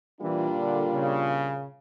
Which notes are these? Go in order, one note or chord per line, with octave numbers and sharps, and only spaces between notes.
A#2 E3 G3 A#3 D4 F4
D3
C#3